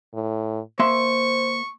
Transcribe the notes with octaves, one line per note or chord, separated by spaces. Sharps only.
A2
A#3 C5 E5 C6 C#6